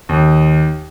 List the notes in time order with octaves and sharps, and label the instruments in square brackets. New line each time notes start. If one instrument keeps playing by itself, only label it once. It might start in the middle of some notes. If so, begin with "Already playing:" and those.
[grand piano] D#2